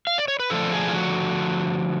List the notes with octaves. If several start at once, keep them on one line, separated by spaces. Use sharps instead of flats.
F5
D5
C#5
B4
D3 F3 A3 D4 A4
G#4
F4
F#4